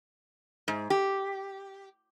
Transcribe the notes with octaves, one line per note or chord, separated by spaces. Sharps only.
G#2
G4